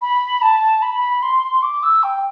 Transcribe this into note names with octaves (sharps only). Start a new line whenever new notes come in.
B5
A5
B5
C6
D6
E6
G5